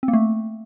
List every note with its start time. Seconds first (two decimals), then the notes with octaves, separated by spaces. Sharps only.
0.03 C4
0.08 A#3
0.13 A3